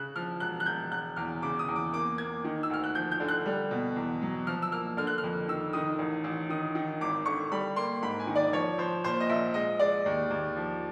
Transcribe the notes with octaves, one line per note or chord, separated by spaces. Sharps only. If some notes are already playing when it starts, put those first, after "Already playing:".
Already playing: C#3 F#6
F3 F6
E1 F#6
F#6
E1 G6
E1 F#6
E2 F6
C#3 D6
D#6
E2
D6
A#3 D6
A#3 G#6
D#3
E6
D2 F6
F#6
F3 G6
G6
D3
F#6
G3
B2
E2
F#3
F3 F6
E6
A#3 F6
D3 F6
F#6
F6
F2
D#3 E6
D#3 D#6
A1
A1
D#3 D#6
D#3
G#1 D6
D3 C#6
G3 B5
A#3 C6
G#2 B5
G#5
D#3
D5
F3 C#5
F3 C5
A#2 C5
D#5
A#1 E5
G#3 D#5
G#3 D5
D#2
D#2
F3